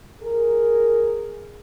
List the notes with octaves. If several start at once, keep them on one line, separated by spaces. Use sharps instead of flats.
G#4 A#4